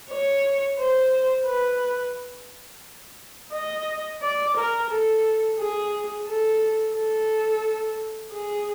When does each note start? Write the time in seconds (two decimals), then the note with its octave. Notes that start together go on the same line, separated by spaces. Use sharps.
0.11 C#5
0.79 C5
1.47 B4
3.53 D#5
4.22 D5
4.57 A#4
4.91 A4
5.59 G#4
6.28 A4
6.96 A4
8.33 G#4